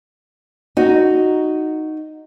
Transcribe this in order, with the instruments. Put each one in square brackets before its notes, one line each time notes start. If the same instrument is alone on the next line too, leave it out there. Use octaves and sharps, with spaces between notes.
[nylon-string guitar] D#4 F#4